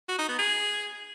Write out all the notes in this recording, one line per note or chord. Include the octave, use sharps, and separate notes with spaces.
F#4
D#4
B3
G#4